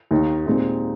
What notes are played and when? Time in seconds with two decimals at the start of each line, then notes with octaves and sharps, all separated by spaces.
0.11 D#2 D#3 A#3 D#4
0.46 A#2 G#3 C4 D#4